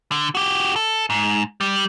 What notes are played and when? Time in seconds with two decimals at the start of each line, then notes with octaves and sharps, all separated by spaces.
0.12 D3
0.35 F#4 G4
0.76 A4
1.10 G#2
1.61 G3